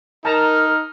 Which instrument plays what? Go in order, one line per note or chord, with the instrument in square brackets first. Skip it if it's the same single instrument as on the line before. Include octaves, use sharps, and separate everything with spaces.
[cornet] D#4 [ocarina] A#4 [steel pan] A5 A#5 [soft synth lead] F6